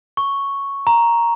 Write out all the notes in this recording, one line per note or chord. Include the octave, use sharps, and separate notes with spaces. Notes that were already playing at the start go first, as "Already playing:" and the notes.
C#6
A#5